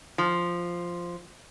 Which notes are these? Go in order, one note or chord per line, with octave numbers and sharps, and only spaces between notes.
F3